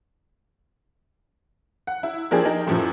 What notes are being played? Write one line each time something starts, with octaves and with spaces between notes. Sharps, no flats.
F#5
E4
F3 A#3 D4 G4 G#4
D#4 G4 A#4
F#2 A2 E3 F3